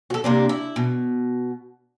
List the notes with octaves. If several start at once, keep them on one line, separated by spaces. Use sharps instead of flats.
F#4 A4
C3 A#3 D4
E4
B2